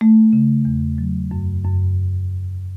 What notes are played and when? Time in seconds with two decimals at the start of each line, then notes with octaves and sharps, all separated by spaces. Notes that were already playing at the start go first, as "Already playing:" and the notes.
0.01 A3
0.33 C#3
0.65 E2
0.98 F#3
1.31 F#2
1.64 F#2